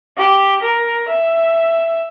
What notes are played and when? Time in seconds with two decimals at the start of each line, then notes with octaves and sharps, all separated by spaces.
0.16 G4
0.62 A#4
1.08 E5